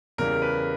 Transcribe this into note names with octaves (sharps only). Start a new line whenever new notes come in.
E2 C#3 E3 G3 A#4
B4